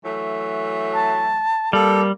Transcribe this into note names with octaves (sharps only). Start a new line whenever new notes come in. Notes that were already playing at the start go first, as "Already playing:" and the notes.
E3 F#3 A3
A5
G3 A#3 A4